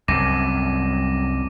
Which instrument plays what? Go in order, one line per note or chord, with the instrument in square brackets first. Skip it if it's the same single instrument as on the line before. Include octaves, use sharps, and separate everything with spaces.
[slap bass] C2 F#2 [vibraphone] G3 [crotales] D6 A#6 D#7